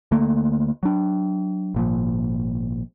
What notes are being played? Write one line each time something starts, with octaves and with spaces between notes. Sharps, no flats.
D2 D3 A3 A#3
F#3 D4
G#1 A#2 F3